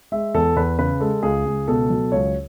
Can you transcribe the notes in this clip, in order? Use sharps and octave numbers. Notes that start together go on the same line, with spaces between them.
G#3 E5
E2 A4
E2 B4
C#3 B4
G#3 A4
C#2 G#4
C#2
B2 A4
F#3
C#2 C#5